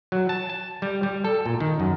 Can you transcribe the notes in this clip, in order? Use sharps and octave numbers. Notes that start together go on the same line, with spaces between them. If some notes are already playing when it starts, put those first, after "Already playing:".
F#3
A5
A5
G3
G3
A4
A#2
D#3
F#2